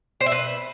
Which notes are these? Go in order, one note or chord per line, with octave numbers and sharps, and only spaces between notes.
C5
E5
B4